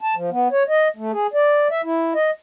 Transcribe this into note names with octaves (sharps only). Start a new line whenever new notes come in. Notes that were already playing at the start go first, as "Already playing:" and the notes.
A5
F3
B3
C#5
D#5
A3
G#4
D5
E5
E4
D#5